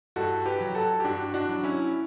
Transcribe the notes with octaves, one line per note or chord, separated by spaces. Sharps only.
G2 F#4 A4
G4 B4
F#3
F#4 A4
G4
G2 D4 F#4
D4 F#4
F#3
C#4 E4